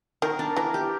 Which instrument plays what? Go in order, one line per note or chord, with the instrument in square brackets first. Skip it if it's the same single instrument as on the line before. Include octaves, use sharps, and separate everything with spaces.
[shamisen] D#3 [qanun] A#4
[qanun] D4
[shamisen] E3 [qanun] A#4
[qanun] G4